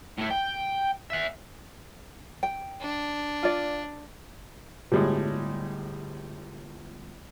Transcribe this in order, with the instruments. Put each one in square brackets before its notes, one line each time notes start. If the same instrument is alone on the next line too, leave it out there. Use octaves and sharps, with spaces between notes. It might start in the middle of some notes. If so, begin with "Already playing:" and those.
[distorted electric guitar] A2 E4
G5
E5 F#5
[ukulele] G5
[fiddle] D4
[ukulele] F4 D5
[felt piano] G1 F#4 [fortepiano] A2 G3 G#3